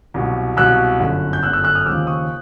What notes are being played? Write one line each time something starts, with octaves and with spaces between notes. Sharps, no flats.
C2 B2 F#3
C2 B2 F#3 E6 F#6
G1 F#2 D3
G6
G1 F#2 D3 E6 F#6
E6 F#6
E6 F#6
D#6 F6
D#2 C#3 F3 D6 E6
C#6 D#6